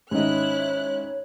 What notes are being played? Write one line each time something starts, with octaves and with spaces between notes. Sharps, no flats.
G#2 D#3 C#4 E4 C#5 D#5 F#6